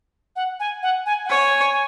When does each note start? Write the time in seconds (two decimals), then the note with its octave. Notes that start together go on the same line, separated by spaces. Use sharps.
0.36 F#5
0.60 G#5
0.83 F#5
1.06 G#5
1.25 F#5
1.29 C#5 G#5